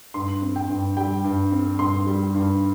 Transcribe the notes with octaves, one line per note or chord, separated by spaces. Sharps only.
G2 C6
C4
G5
G2
G3 G5
G2
C4
G2 C6
G3
G2